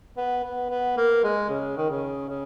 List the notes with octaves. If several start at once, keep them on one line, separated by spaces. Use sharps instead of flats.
B3
B3
B3
A#3
G#3
C#3
D#3
C#3
C#3